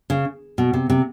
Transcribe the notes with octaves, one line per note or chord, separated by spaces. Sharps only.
C#3
B2
C3
C3